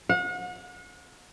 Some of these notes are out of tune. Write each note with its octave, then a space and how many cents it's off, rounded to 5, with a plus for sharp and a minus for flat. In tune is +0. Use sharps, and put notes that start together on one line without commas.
F#5 -40